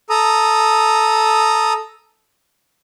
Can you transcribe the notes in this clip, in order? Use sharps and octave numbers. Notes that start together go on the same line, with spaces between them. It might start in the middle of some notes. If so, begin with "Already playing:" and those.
A4 A#5 D#6